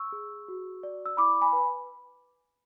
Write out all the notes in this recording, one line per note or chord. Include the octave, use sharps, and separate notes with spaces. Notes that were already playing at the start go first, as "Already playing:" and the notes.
Already playing: C#6 E6
G#4
F#4
D5
E6
E4 B5 D6
G#5 B5
B4